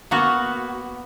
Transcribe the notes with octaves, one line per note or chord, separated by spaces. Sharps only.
A#3 B3 F#4